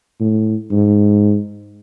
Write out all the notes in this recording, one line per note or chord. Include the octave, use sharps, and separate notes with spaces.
A2
G#2